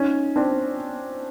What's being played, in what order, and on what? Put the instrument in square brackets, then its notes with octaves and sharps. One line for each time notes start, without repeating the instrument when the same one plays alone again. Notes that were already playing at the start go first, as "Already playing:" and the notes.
Already playing: [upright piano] C#4 D#4
C4 D4